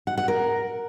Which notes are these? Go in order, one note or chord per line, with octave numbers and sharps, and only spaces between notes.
F#5
F#5
A#4